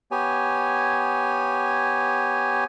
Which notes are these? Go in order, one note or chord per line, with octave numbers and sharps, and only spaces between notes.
B3 G4 C#5 G#5